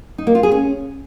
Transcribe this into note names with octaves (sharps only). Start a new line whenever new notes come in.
D#4
A#3
F4
G#4
C#4